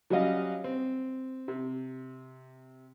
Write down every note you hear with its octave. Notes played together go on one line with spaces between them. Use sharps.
F#3 G3 C#4 F#4 D#5 F5
C4
C3